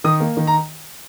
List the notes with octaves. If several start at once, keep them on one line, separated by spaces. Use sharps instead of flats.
D#3 D#6
A#3
D#3
A#5